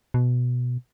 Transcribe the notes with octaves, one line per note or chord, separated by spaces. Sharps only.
B2